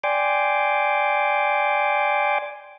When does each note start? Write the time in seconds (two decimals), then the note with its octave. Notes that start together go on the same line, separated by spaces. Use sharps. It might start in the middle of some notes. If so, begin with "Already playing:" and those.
0.04 D5 G5 G#5 C6 D6